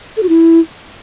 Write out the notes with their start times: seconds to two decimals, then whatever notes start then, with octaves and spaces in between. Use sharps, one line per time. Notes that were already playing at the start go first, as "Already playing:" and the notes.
0.17 A4
0.23 F#4
0.29 E4